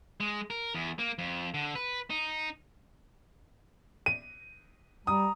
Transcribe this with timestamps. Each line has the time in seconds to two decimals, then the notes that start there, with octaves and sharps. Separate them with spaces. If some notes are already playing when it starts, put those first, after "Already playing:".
0.20 G#3
0.50 A#4
0.75 E2
0.99 A#3
1.18 F2
1.54 D3
1.75 B4
2.10 D#4
4.06 D#7
5.07 G3 A#5 D#6